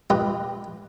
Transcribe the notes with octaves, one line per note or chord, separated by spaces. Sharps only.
F4 G4 B4 D#5